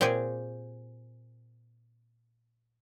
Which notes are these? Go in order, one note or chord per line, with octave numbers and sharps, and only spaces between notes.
A#2 C4 G4 G#4 G#5